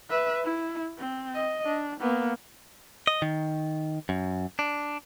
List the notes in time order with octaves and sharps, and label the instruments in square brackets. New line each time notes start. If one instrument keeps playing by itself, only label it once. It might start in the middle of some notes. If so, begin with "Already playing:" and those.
[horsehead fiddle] B4 E5
E4
C4
D#5
D4
A#3 B3
[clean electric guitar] D#5
D#3
F#2
D4